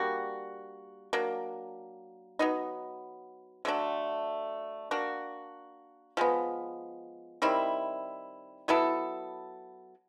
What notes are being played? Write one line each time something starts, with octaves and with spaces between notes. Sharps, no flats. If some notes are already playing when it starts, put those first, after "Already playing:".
Already playing: G3 A#3 D4 F#4
F#3 A#3 D4
F#3 B3 D#4
D3 F#3 A3 D4
A#3 D4 F#4
F3 G#3 B3
D#3 G3 C4 E4
F#3 B3 E4 A4